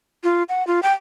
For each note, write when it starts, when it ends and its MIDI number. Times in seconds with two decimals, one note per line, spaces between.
0.24 0.43 65
0.49 0.65 78
0.67 0.80 65
0.83 0.93 79